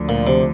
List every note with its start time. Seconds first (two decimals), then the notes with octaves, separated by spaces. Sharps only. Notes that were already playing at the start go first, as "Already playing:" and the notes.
Already playing: D2 D3 F3
0.09 A#2
0.27 C3